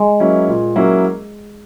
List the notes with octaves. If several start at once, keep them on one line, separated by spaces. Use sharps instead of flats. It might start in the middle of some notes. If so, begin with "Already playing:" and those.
Already playing: G#3
F#3 A#3 C#4 E4
A#2
F#3 A#3 C#4 E4